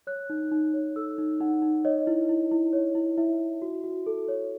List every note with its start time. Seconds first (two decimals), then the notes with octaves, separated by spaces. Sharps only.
0.07 C#5 F#6
0.30 D#4
0.51 D#4
0.74 C#5
0.96 A4 E6
1.18 D#4
1.41 D#4 F#5
1.62 D#4
1.85 C#5 D#5
2.07 E4
2.29 E4
2.51 E4
2.73 C#5
2.95 E4
3.18 E4 E5
3.40 E4
3.62 F#4
3.84 F#4
4.06 A4
4.28 C#5